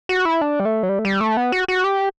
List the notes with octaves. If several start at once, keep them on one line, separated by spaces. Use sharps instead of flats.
F#4
E4
D4
G3
A3
F#3
G3
A3
G3
A3
B3
F#4
F#4
G4